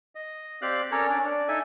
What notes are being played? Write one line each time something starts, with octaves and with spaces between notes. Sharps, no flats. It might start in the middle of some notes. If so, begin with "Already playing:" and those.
D#5
C4 G4 D5 F5 F#6
C#4 A4 A#4 C#5 D5
C#4 D4 D5
D4 D5
D#4 A4 E5 G#5